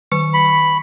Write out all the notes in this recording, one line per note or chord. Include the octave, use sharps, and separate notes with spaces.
D#3 C#6 C#7
B5